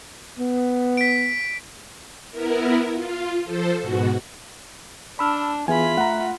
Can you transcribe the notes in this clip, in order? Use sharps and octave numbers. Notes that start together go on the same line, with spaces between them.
B3
B6 D7
B3 E4 A#4
F4
F3 A4 C5
G#2 B2 F#4
D4 A5 B5 E6 F6
E3 B3 F4 G#4 E5 G#5 B5
A3 F#5 A#5